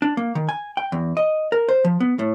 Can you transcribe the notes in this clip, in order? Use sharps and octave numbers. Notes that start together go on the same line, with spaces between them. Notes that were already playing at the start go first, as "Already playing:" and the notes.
D4
A#3
D#3
G#5
G5
E2
D#5
A#4
C5
F3
B3
A2